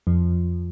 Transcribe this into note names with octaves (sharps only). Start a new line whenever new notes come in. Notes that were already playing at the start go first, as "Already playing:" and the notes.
F2 F3